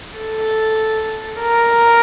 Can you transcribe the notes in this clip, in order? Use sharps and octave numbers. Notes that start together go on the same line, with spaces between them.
A4
A#4